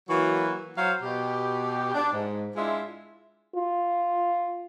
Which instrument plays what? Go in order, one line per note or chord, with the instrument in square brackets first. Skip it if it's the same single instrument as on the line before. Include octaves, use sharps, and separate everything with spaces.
[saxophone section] E3 F#3 A#3 F#4
F#3 F#4 C5 F5
B2 G4
D4
G#2
G#3 D4 E4 F4 E5
[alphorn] F4